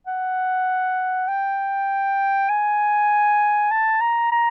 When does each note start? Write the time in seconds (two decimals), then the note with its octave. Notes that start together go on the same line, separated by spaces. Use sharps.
0.07 F#5
1.28 G5
2.50 G#5
3.71 A5
4.01 A#5
4.32 A#5